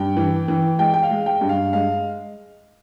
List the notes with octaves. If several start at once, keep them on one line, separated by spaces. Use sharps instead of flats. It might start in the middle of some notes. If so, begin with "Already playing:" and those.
Already playing: G2 G5
E3
E3
G#3 G5
G5
F5
G#3
G5
G2
F5
G#3 F5